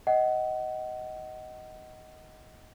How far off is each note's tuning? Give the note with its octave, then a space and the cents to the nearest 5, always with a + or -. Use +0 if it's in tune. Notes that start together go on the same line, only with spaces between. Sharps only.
D#5 +10 F#5 +25